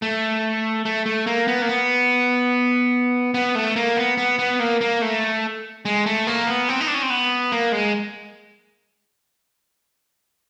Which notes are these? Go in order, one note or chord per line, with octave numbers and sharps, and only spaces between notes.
A3
A3
A3
A#3
B3
A#3
B3
B3
A3
A#3
B3
B3
B3
A#3
A#3
A3
G#3
A3
A#3
B3
C4
D#4
D4
C#4
C4
B3
A#3
G#3